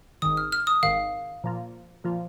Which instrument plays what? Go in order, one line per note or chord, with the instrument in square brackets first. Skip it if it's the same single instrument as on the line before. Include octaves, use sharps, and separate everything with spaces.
[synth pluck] G#1 G#2 D#3 [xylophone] D#6
[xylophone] F6
F6
D#6
[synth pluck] G#1 G#2 D#3 [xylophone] F5
[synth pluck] A#2 F3 A#3 F4
A#2 F3 A#3 F4